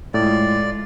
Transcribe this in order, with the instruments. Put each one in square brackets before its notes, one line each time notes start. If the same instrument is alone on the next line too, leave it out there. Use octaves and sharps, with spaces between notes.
[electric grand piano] A2 [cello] G#3 F4 [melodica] D5